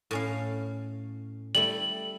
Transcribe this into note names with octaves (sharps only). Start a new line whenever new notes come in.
A2 C#4 F5
G3 A3 E4 F#7